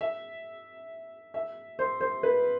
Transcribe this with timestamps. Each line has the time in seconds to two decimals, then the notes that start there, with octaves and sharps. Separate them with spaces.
0.01 E5
1.34 E5
1.79 C5
2.01 C5
2.23 B4